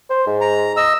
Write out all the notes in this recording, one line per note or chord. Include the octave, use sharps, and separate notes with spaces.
C5
G#2
A#5
D#5 E6